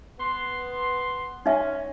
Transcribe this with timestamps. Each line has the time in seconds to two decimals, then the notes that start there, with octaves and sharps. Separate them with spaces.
0.19 B3 C6
1.46 C#4 D#4 E5 G#5